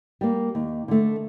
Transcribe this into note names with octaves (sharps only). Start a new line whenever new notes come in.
G3 A#3
D#2
D3 A3